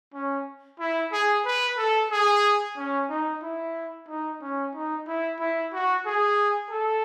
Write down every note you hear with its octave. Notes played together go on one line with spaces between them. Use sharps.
C#4
E4
G#4
B4
A4
G#4
C#4
D#4
E4
D#4
C#4
D#4
E4
E4
F#4
G#4
A4